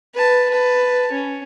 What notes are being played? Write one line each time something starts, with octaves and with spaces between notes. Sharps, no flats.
B4 A5
B4 A5
C#4